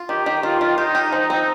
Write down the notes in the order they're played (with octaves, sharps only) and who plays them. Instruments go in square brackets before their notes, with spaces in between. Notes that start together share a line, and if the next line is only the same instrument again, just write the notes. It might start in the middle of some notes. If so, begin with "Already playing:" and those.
Already playing: [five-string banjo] F4
[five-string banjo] D#3 [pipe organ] G4
[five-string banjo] D#3
[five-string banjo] D#3 [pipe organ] F4
[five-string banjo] D#3
[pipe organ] D#4 [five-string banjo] G4
[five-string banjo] G4
F3
C4